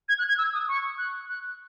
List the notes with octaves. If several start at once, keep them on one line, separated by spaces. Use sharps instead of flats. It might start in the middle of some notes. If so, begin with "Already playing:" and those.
G#6
F#6
G#6
E6
D#6
C#6
F#6
F#6